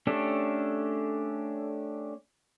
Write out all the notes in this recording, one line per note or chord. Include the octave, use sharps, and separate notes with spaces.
A3 C#4 D4 G4 A4